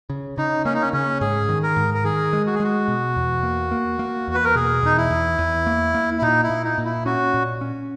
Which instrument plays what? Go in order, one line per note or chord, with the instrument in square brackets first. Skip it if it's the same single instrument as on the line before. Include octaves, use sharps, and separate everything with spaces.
[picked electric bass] C#3
[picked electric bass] C#3 [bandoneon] D#4
[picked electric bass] A#3 [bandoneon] C#4
[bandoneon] D#4
C#4
[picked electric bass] C#3 [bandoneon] C#4
[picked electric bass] G#2 [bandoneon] G#4
[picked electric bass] D#3
[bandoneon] A#4
[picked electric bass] G#2
[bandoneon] A#4
[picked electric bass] D#3 [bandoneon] G#4
[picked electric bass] G#3
[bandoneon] F#4
G#4
[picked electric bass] G#3 [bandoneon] F#4
[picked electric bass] B2
E2
A#3
A#3
A#3
E2
[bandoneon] B4
A#4
[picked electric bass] B2 [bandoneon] G#4
[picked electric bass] E2 [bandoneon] D#4
[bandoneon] E4
[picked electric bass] E2
E2
A#3
A#3
[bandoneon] E4
[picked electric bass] A#2 [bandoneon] D#4
[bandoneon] E4
[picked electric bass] A#2
[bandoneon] D#4
[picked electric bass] A#2
[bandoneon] E4
[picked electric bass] C#4 [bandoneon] F#4
[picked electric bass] A#2
C#4